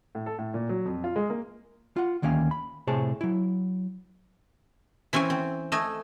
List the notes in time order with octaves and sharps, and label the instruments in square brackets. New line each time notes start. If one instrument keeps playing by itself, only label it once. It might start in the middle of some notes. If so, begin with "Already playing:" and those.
[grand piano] A2
A4
A2
A#2
F#3
F2
F4
G#3
A#3
[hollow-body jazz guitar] F4 F#5
D2 D#3 A#3 C#4 F5
B5
A2 C3 G#4 C5 C#5 A5
F#3 E4
[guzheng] E3 C4 C#4 C#5 G#5
C4
A3 D#5 G#5